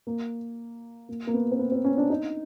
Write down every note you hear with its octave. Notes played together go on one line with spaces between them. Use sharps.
A#3
A#3
A#3
B3
C4
B3
C4
C#4
D4
D#4